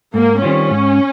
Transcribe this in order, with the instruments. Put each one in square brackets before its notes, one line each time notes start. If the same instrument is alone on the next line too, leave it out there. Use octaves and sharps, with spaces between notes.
[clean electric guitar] G#2 [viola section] A#3
[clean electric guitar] D#3 G3 C4 F4 [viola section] C#4
[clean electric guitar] G#2